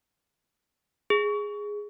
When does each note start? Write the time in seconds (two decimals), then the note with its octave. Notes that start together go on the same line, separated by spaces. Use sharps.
1.10 G#4